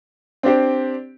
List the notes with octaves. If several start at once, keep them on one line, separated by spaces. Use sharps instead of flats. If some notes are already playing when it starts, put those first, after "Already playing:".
C4 D4 G4 C5